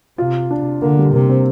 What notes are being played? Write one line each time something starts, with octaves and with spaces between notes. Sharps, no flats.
C3 F4
D4
D3 A#3
G3
C3 A#3
C4